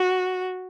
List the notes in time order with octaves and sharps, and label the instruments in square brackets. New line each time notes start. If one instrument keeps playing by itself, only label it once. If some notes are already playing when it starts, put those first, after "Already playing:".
Already playing: [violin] F#4